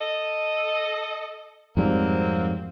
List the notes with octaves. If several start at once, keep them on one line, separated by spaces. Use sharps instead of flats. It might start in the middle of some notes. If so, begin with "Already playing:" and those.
A4 D#5
F2 G#2 F#3 G3 A#3 C4